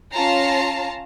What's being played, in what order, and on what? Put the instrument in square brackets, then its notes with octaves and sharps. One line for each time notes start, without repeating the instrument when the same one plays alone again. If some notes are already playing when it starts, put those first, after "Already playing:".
[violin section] C#4 F4 A5 A#5 C7